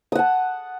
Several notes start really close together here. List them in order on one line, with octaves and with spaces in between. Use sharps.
D#6 F#5 A5